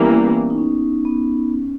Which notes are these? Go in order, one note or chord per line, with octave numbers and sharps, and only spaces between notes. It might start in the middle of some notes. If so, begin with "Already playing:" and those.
Already playing: E3 G3 A#3 B3 C#4
B3
D#4
C#4
B3
C#4